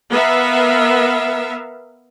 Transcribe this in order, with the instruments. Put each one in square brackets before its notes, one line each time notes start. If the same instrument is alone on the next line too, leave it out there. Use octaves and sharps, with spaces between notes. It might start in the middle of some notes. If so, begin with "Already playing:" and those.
[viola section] B3 A#4 E5 F5